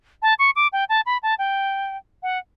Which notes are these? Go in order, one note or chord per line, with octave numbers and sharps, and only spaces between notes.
A5
C#6
D6
G5
A5
B5
A5
G5
F#5